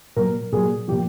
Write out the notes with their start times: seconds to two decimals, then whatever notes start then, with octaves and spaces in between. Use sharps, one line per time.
0.16 A#2 F#3 A#4
0.52 A#2 F#3 G#4
0.88 A#2 F3 G4